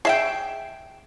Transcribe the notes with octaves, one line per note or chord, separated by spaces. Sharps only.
G#4 E5 G5